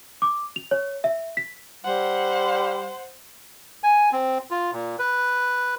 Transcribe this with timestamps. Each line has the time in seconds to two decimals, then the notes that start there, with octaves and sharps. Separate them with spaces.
0.22 D6
0.56 F7
0.71 C#5
1.04 E5
1.37 B6
1.85 G3 C5 F#5
3.83 G#5
4.13 C4
4.51 F4
4.73 A#2
4.99 B4